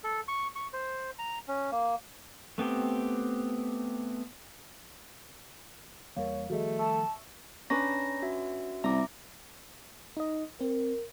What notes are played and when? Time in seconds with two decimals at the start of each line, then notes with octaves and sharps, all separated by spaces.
0.04 A4
0.28 C#6
0.56 C#6
0.73 C5
1.19 A#5
1.48 C#4
1.72 A#3
2.58 A3 B3 C4 G4
6.17 E2 G3 A#3 A#4 C#5 F5
6.50 D#3 F3 G3 A3 F#4 G#4 D#5
6.79 E5 A5 C#6 E6
7.70 C#4 D4 B4 C#5 A#5 A#6
8.22 F#4 E5
8.84 C2 E5 A#5 D6
10.17 D#4 D#5
10.61 C4 A#4